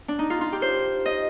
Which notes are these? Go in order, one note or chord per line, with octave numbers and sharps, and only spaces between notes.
D4
D#4
F4
F4
G4
C5
D#5